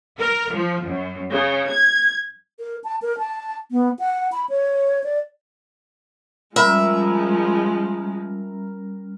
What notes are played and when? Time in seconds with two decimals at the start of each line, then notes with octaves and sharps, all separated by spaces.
0.19 A#4
0.53 F3
0.85 F#2
1.31 C#3
1.70 G#6
2.60 A#4
2.84 A5
3.02 A#4
3.18 A5
3.72 B3
3.99 F#5
4.32 B5
4.50 C#5
5.04 D5
6.56 F3 G3 G#3 C#4 A#4 E5 B5